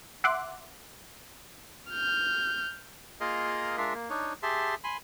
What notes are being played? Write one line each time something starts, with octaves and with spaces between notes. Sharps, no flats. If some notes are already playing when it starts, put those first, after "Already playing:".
E5 F#5 C6 D6 F#6
F6 G6
A#3 F4 G#4 A#4 D#5 F5
G#3 D4 F4 A#4 E5 F5
A#3
D4 D#4 C#5
G4 G#4 E5 A5 C6
G#5 B5 C6